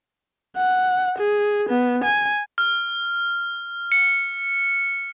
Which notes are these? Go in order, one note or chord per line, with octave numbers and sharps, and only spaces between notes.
F#5
G#4
B3
G#5
F6
C#7